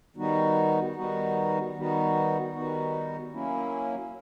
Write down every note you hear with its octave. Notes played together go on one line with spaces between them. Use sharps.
D#3 G3 B3 D#4 F#4
D#3 G3 B3 D#4 F#4
D#3 G3 B3 D#4 F#4
D#3 G3 B3 D#4 F#4
F#3 A#3 C#4 E4